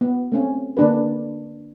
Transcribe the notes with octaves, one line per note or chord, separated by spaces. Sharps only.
B3
A3 C4 C#4
D3 A#3 D4 G#4 B4